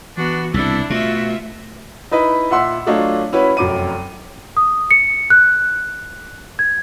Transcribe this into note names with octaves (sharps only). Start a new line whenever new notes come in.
E3 B3 D4 F#4
C2 B2 D4 E4 A4 B6
B2 A3 F4 F#4 E5
D#4 E4 B4 D#5
A#2 E5 F#5 C6 E6
F#3 A3 D4 F4 C#5 D#5
C#4 E4 F#4 B4
F1 F#2 D6 D#7
D#6
C#7
F#6
G#6